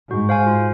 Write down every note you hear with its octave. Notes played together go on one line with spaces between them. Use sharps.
G#2 F#4
C5 F5 G#5
F4